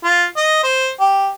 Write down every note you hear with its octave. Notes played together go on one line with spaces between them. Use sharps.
F4
D#5
C5
G4